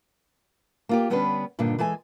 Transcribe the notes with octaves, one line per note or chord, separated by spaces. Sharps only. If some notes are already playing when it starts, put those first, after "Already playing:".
A#3 F4 G4
D3 G3 B3 C#4 D4 B4
G2 A#2 D3 D#3 D4
E3 G#3 A4 G#5